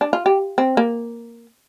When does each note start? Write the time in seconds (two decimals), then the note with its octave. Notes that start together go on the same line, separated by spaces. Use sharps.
0.01 D4
0.13 F4
0.26 G4
0.58 C4
0.77 A#3